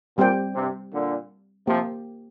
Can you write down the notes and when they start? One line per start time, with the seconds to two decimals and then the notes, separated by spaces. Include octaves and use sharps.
0.18 A#2 G3 C4 G4 C5 G5
0.55 G2 C3
0.93 A#2 D3
1.67 C3 F3 A#3 G4 C5 G5